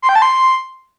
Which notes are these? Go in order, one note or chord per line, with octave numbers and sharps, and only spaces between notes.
C6
G5
A5
C6